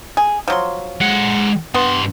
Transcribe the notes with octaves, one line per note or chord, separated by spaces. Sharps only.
G#4
F3 F#3 C6
G#3 F#5
G2 B3 C6